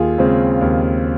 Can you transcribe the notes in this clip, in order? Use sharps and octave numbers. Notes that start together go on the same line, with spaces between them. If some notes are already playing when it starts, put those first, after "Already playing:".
Already playing: D#2 F4 G#4
C#3 G#3 C4
D#2